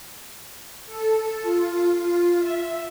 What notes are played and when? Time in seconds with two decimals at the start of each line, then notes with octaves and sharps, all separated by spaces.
0.86 A4
1.42 F4
2.38 E5